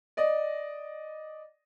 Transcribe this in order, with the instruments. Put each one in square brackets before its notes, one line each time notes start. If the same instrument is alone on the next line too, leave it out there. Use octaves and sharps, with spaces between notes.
[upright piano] D5 D#5